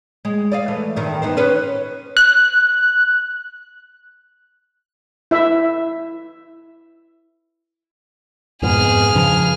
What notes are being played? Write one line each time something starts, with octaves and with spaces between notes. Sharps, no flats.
G#3
D5 D#5 F5
E3 A3
E2 G2 D#3
B3 D#4 C5
C#4 B4 C5
F#6
E4 E5
F2 G#2 B2 G#4 F6
G2 C#3 F3